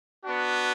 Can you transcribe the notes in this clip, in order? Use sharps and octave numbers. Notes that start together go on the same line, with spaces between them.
B3 D4 F#4